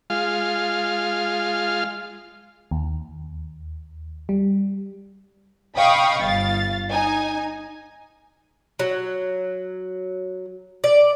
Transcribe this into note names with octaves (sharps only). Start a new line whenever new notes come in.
G#3 F4 F5
D#2
G3
D#5 F5 G5 B5 C#6 D#6
G1 F5 A6
D#4 G#5
F#3
D5